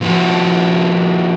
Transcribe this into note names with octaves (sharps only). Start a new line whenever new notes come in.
A#2 F3 E4 F#4